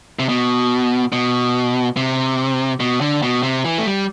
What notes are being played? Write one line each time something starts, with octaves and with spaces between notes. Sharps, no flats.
C3
B2
B2
C3
B2
D3
B2
C3
E3
A3
G3